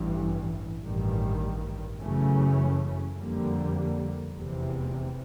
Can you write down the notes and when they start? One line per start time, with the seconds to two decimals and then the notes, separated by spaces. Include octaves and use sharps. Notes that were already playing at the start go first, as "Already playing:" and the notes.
Already playing: A1 G2 E3
0.84 A1 G2 D#3
2.00 F#2 C#3 E3 A3 C#4
3.16 F2 D3 G3 A#3
4.33 F1 E2 C3 E3